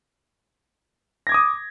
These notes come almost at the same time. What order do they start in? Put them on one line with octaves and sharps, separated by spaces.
A#6 G#6 D6 D#6